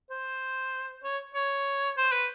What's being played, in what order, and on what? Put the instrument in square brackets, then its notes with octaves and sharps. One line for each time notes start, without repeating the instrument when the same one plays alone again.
[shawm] C5
C#5
C#5
C5
B4